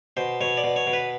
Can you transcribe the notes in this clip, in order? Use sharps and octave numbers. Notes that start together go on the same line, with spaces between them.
B2 C5
B2 C#5
D5
B2
C#5
B2
B4